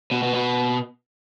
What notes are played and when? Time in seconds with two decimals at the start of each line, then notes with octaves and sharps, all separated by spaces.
0.11 B2
0.23 B2
0.34 B2